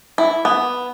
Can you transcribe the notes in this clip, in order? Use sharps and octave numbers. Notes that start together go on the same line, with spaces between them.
E4
B3